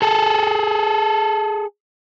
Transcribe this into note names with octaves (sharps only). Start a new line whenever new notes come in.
G#4 A4